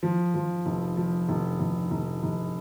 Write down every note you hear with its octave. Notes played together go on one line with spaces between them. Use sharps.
F3
F3
F1
F3
F1
F1
F1
F1